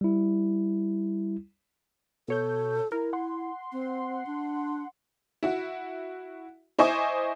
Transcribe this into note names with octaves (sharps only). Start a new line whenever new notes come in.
G3 E4
B2 A4 C#5 G6
E4 A#4
F#5 C6
C4
D4
E4 F#4
E4 C5 D#5 G#5 C#6 D6